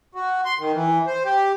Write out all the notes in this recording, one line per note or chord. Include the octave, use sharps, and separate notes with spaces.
F#4
C6
D#3
E3
C5
G4